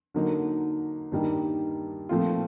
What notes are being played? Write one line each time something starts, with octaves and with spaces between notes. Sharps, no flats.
D3 F#3 A#3 D#4
G2 D#3 G3 A#3 D#4
A#2 F3 A3 C4 F4